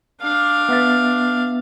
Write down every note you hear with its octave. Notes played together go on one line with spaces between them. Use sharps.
D4 F5
B3 E5 A6